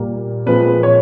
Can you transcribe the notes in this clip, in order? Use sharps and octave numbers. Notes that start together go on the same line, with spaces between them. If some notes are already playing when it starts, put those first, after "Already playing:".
Already playing: A#2 G3 A#3
A#2 F3 G#3 C4 B4
C#5